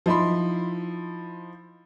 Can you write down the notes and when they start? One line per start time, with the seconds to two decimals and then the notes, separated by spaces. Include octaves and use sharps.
0.06 F3 D#4 E4 B5 C6